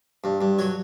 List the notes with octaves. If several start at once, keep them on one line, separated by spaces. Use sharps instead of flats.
G2
G2
F#3 C#5